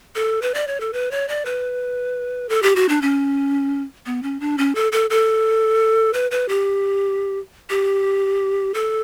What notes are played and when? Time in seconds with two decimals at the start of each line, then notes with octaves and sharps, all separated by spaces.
0.15 A4
0.42 B4
0.54 D5
0.67 C#5
0.80 A4
0.93 B4
1.11 C#5
1.28 D5
1.45 B4
2.49 A4
2.63 G4
2.76 F#4
2.89 D4
3.02 C#4
4.06 B3
4.23 C#4
4.40 D4
4.58 C#4
4.75 A4
4.92 A4
5.10 A4
6.13 B4
6.31 B4
6.49 G4
7.70 G4
8.74 A4